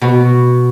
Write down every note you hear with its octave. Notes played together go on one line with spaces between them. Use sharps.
B2